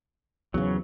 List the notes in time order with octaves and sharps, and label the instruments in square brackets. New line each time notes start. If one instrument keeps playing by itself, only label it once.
[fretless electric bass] E2 G#2 C#3 [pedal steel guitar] F#3